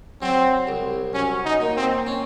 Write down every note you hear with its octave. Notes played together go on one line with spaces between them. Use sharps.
F#3 C4
C2
F#3 C#4
D#4
A#2
C4
C#4